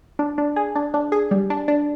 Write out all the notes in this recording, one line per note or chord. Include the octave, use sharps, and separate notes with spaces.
D4
D4
G#4
D4
D4
G#4
G3
D4
D4